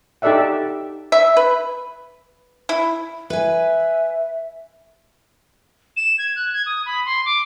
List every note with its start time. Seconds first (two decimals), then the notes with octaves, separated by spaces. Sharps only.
0.22 D#4 G4 A4 D5 E5 F#5
1.12 E5
1.37 B4
2.69 E4
3.30 B4 E5 G#5
5.97 E7
6.18 G#6
6.36 F#6
6.53 G#6
6.66 D#6
6.86 B5
7.06 C6
7.26 D6